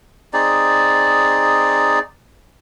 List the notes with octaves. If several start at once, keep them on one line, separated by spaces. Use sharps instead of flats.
C4 D#4 G#4 D5